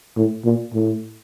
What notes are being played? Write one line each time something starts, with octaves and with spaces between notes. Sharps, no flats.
A2
A#2
A2